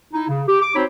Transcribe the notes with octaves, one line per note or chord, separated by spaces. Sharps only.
D#4 E4
C#3
G4
D6
C4 D#4 F#4 C5 C#5 B5